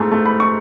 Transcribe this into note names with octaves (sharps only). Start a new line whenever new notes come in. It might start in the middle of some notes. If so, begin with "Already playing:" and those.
Already playing: G#2 A3 G#5
A3
B5
C#6